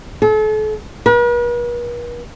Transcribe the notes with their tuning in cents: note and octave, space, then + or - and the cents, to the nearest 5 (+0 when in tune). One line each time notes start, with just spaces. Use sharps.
A4 -40
B4 -45